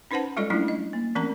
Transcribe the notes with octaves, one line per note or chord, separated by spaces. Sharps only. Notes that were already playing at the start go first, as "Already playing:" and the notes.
C#4 D#4 B4 C5 F#5 A5
G3 G#3 F4 A4 D5 D#5
F#3 G3 A3 C#4 D4 E4
D#5
A#3
E3 A3 C4 C#4 A#4 A#5